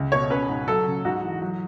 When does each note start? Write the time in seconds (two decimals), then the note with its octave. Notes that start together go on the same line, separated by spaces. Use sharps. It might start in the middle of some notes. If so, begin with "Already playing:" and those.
Already playing: C#2
0.12 B2 C#5
0.30 C#4 B4
0.49 G#2
0.68 F#3 A4
0.86 C#3
1.05 G#2 F#4
1.23 E3
1.42 F#3